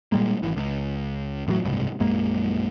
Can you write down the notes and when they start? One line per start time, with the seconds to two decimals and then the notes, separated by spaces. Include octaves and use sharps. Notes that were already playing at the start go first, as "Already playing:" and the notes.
0.12 A#2 G3 G#3 A#3
0.42 G#1 E3
0.56 C#2
1.47 A1 A2 C#3 F#3
1.64 F#1 C2 G#2
2.00 A#1 F#2 G#3 A#3